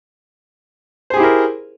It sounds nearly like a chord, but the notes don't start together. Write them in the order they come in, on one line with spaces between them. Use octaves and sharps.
C5 G#4 G4 E4 A#4